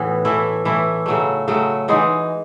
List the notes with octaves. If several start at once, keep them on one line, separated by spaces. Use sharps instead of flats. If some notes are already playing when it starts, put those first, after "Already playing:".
Already playing: A2 E3 B3 F#4
E3 A3 E4
E3 A3 E4
C#3 F#3 A3
C#3 F#3 A3
E3 G#3 D#4 F#4